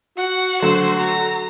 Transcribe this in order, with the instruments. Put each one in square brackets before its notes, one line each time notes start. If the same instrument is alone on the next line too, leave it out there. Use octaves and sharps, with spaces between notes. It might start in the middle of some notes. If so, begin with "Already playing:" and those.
[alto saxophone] F#4 [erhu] F#5
[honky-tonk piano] D3 F#3 A3 [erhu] C5
[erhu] A#5